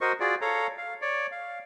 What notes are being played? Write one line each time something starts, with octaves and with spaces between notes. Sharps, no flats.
F#4 A#4 C5 D#5 C#6
F4 F#4 G#4 D5
A4 C#5 F5 A#5
F5
C#5 D5
F5